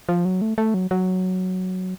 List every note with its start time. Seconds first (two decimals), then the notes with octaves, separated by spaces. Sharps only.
0.09 F3
0.25 F#3
0.42 A3
0.58 A3
0.74 F#3
0.91 F#3